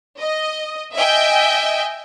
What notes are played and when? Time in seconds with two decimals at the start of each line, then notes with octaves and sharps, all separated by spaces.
0.19 D#5
0.95 D#5 E5 G5 G#5